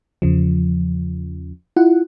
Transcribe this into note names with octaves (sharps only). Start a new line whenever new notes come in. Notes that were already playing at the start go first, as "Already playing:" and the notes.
E2 C#3 F3
E4 F4 F#5